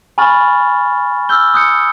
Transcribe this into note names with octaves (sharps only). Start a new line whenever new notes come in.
G#5 B5 C#6 F6 A6
E6 F6 G6 G7
D#6 F#6 G6 C#7